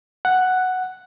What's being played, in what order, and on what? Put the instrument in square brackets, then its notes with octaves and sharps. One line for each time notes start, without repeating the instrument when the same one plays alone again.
[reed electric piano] F#5